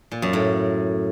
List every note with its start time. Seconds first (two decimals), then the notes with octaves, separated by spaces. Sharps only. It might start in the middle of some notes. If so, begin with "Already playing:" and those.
0.11 A#2
0.22 F#2
0.33 A2